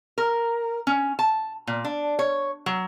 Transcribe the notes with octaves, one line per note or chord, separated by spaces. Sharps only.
A#4
C#4
A5
A#2
D4
C#5
F#3